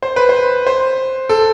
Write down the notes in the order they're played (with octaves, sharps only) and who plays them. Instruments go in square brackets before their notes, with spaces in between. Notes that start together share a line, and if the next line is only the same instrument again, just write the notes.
[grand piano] C5
B4
C5
C5
A4